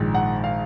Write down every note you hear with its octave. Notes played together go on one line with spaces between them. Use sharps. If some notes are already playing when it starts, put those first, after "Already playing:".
Already playing: A#1 G#2 D#3
F#5
F5